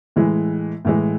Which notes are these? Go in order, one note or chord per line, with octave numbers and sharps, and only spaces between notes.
A2 E3 G#3
A2 E3 G#3